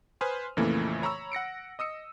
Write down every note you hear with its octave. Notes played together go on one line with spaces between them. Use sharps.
B4 C5 G#5 C6 D#6 F6
F2 A#2 C#3 E3 A3 A#3
C#5 A#5 B5 C#6 E6
F#5 A#6 C#7 D7
D#5 D#6 E6 C#7